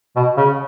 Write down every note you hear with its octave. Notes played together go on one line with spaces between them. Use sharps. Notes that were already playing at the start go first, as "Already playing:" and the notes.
B2
C#3